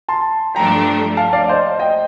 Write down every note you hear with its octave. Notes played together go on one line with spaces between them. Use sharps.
A5 C6
G2 F3 A3 D4 G5 A#5
F5 A5
D5 F5
D5
C5 D#5
D#5 G5